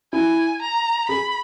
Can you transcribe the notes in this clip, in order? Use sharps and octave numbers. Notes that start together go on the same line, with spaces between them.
E4 G#5
A#5
G#4 B5